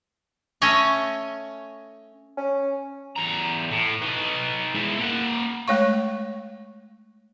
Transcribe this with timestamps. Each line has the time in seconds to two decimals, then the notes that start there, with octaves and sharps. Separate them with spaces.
0.62 A3 C#4 C#5 D#5 G#5
2.38 C#4
3.16 E2 A#5
3.71 A2
4.02 D#4 B4
4.74 G#3 E4
4.99 A#3 F#5
5.68 G#3 A3 C#5 F5 C#6